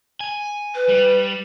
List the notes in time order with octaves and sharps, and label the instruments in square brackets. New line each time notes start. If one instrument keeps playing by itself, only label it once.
[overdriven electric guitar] G#5
[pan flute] B4
[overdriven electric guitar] G3